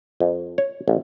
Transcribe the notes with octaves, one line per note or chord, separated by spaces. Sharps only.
F2
C#5
A1